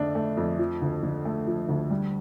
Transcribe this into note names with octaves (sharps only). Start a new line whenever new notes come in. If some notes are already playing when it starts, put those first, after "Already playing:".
Already playing: F2 D3 A3 D4
A3
F2
F3
D2
D3
A3
F3
D2
G3